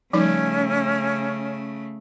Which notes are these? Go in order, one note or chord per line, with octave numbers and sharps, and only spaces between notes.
C#3 F3 G3 A3 C#4 D#4